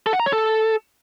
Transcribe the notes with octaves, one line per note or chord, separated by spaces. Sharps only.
A4
F#5
A#5
C#5
A4